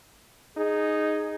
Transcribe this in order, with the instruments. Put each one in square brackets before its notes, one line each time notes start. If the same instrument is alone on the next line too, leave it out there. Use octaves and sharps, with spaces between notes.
[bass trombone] D#4 [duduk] G#4